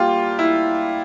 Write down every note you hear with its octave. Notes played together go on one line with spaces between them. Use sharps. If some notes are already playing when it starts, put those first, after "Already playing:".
Already playing: G3 A#3 F4 G4
E4